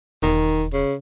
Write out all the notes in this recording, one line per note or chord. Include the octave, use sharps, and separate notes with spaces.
E1 D#3
C#3